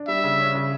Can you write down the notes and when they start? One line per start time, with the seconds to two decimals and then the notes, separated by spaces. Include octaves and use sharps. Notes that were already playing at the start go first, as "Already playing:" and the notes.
Already playing: D4
0.08 G3 E5
0.24 C#3
0.40 C#4
0.55 C#3